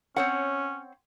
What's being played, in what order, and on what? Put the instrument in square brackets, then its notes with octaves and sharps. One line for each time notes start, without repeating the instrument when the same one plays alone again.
[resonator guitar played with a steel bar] C4 C#5 F#5 [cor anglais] C#4